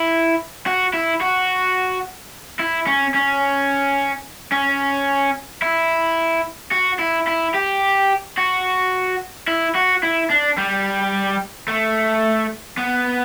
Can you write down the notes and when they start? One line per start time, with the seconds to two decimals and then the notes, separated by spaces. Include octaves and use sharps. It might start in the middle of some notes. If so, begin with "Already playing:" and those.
Already playing: E4
0.66 F#4
0.94 E4
1.21 F#4
2.59 E4
2.86 C#4
3.14 C#4
4.52 C#4
5.62 E4
6.72 F#4
6.99 E4
7.28 E4
7.55 G4
8.37 F#4
9.48 E4
9.75 F#4
10.03 E4
10.30 D4
10.58 G3
11.68 A3
12.78 B3